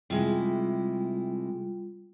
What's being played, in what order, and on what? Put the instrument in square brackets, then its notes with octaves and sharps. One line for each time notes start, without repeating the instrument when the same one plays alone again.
[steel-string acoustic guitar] C3 G#3 E4 [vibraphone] G3 F4